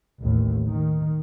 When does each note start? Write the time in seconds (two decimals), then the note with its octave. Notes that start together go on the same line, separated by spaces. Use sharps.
0.22 A1 D#2
0.69 D#3